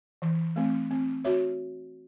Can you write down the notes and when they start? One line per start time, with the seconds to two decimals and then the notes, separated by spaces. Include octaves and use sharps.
0.22 E3
0.56 A3 C4
0.91 C4
1.24 F#4 C#5 E5